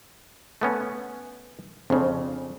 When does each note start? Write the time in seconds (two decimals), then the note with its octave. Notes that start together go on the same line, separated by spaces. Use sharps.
0.61 A3 B3 C#4
1.90 F2 C#3 C4 D4